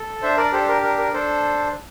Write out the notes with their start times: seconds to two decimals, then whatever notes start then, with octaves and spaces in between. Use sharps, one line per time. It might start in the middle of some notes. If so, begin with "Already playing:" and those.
Already playing: A4
0.22 D4 C5 E5
0.37 A#4 D5
0.52 G4 A4 C5
0.68 A#4
0.82 D4 A#4
0.98 A#4
1.13 D4 A4 C5